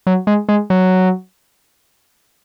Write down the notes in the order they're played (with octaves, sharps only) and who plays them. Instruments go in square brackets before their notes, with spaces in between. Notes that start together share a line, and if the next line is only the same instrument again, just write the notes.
[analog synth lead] F#3
G#3
G#3
F#3